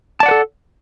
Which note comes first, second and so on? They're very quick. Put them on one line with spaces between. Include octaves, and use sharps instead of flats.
A5 D5 F#5 B4 A4